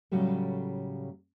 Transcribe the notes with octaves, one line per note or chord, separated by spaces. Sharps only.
A2 C#3 F#3 G3 A3